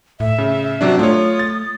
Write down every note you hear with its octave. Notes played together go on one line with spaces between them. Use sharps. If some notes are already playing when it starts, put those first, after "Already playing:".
A2 E5
C#3
C3 F#3 D4
A3 F4 C#5 D#6
A6